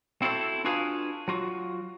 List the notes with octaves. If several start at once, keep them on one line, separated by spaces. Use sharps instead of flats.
C4 E4 F#4 A4 C5
D4 F4 F#4 G#4 B4 F5
F#3 F4 F#4